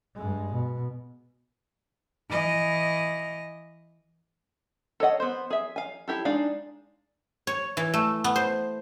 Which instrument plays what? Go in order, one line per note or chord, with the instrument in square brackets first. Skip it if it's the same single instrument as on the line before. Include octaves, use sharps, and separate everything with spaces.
[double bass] G2 G#3
B2
[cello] E3 D#5
[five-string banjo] A4 C#5 D#5 F#5
B3 C5
G#4 E5
F5 G#5
E4 G4 A4
G#3 D4 D#4 F5
[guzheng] C#5
E3
A3
B3
C5